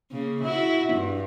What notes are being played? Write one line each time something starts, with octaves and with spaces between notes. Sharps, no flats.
C#3 A#3
E4 F#4
G2